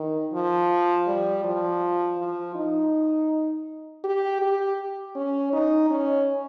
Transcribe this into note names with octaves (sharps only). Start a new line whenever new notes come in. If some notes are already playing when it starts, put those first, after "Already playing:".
Already playing: D#3
F3
G3
F3
F3
D#4
G4
G4
C#4
D#4
C#4